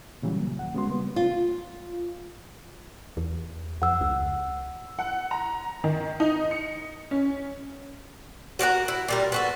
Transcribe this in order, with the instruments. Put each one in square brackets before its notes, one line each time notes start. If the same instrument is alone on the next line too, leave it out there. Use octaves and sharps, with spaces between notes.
[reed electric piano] A#2 C#3 E3 F#3 G3
A#3
D#2 F#5
C#3 G#3 B3 F#4 C6
G3 A#3 B3
[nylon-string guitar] F4
[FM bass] E2
[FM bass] F2 [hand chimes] F#5 E6
[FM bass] C#2
[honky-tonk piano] F#5
A#5
D#3
D#4
C#7
C#4
[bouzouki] F#4 A#4 C#5 F#5
E4
A#2 G3 A#4
B3 F#4 A4